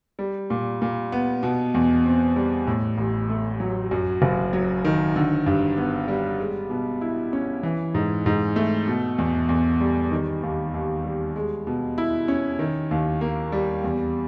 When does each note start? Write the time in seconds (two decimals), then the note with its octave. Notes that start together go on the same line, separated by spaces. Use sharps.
0.19 G3
0.50 A#2
0.82 A#2
1.12 B3
1.43 B2
1.74 E2
2.05 C4
2.36 G3
2.67 A2
2.98 A1
3.29 A3
3.60 F#3
3.91 F#2
4.22 F#1
4.53 F#3
4.85 D#3
5.16 D3
5.46 G2
5.77 B3
6.08 G3
6.39 G#3
6.70 B2
7.01 E4
7.33 C#4
7.63 E3
7.94 G#2
8.26 G#2
8.56 A3
8.87 B2
9.18 E2
9.49 E2
9.80 G3
10.11 D#3
10.43 D#2
10.74 D#2
11.04 G3
11.36 G#3
11.67 B2
11.98 E4
12.28 C#4
12.59 D#3
12.91 D#2
13.21 A#3
13.52 G3
13.84 E2